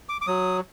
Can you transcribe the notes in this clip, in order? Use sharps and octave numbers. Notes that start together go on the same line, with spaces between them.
D6
D6
F#3 D#6